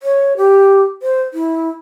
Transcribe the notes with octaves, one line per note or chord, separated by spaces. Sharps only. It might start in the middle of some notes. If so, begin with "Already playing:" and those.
C#5
G4
C5
E4